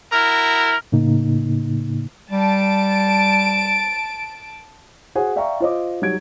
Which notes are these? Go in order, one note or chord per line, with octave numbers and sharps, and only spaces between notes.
E4 F#4 A#4 F6
A2 C#3 A#3 D#4
G3 A5 D7
F#4 G#4 C5 F#5 G#5
D5 E5 F5 G5 A#5 C#6
F4 C5 D#5 D6
F#3 G3 D#4 G#6 D7